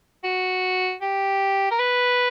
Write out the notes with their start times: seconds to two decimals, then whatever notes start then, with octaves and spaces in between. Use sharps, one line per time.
0.24 F#4
1.01 G4
1.71 A#4
1.79 B4